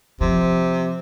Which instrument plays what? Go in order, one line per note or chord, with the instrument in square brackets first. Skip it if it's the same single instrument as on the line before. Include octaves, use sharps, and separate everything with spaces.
[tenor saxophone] C3 [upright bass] F3